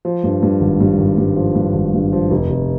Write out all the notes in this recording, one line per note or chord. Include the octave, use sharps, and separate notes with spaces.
F3
G2
G2
G#1
G2
G#1
G2
F3
G2
G#1
G2
F3
F1
F1